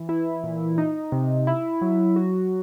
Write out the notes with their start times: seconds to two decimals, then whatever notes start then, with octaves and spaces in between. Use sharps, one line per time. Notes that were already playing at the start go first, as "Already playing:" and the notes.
Already playing: E3
0.09 E4
0.44 A#2
0.78 D#4
1.12 C3
1.47 E4
1.81 F#3
2.16 F#4